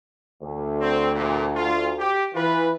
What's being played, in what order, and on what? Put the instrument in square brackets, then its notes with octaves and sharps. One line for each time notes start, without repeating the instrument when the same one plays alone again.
[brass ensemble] D2
[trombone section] C4
E2 A#2
F4
G4
[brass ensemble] E3 [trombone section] F4 B4